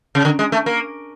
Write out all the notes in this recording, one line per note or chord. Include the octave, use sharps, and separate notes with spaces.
C#3
D3
G#3
A3
A#3